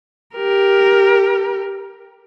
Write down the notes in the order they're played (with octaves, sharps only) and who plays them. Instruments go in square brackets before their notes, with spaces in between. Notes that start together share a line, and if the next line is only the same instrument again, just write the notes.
[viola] G4 A#4